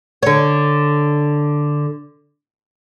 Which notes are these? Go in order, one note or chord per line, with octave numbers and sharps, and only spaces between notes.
D3 C#5